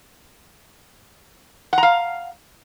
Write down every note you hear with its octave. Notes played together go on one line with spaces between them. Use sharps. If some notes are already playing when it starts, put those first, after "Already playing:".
F5 F#5 A#5